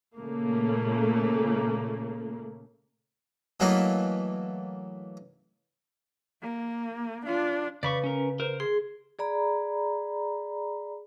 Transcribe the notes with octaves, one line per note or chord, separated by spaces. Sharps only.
A#2 C#3 A3 A#3
E3 F#3 A3 A#3 D#4 E4
A#3
D4 F4
C#3 B4 D5 B5 C#6
C#4 A#4
A#4 C5
G#4 C6
G#4 D5 A#5 B5